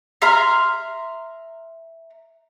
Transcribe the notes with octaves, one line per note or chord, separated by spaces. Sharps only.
E5 A#5 C6 F6